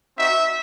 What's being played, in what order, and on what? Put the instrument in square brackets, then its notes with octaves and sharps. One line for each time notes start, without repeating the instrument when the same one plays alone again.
[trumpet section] C4 D#4 F#4 E5